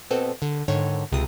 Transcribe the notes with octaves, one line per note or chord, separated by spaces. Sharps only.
B2 B3 C4 A4
D3
G#2 D3 D#3 C#5
C#2 C3 D#6